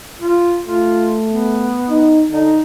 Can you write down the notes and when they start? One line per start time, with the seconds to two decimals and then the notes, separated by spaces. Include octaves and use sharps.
0.19 F4
0.65 A3 F4
1.29 B3
1.89 D#4
2.31 D3 D#4